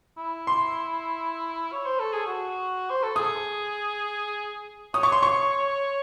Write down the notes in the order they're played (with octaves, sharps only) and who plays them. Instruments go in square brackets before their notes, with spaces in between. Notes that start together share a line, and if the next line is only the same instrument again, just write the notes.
[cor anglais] E4
[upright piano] C6
[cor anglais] C#5
C5
A4
G#4
F#4
C5
A4
[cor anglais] G#4 [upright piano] D#6
[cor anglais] C#5 [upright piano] D#6
[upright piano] C#6
C6
C#6